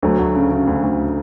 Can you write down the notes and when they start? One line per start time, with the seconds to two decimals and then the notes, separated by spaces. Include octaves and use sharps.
0.02 D2 F#3 A3
0.19 D2
0.35 C#3
0.51 C#3
0.67 D2
0.83 D2